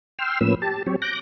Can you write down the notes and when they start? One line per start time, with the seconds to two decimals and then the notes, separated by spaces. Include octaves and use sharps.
0.19 G5 C6 E6 F6
0.41 A2 F3 A#3 C#4 B4 E6
0.62 G4 A5
0.86 F#3 C4 G4 C#5
1.02 D6 F#6 G6 A#6